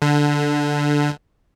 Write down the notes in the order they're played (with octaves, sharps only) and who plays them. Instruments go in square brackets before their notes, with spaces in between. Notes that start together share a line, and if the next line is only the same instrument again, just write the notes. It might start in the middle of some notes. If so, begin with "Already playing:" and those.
[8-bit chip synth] D3